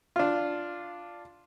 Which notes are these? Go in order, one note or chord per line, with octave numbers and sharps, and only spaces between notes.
D4 F4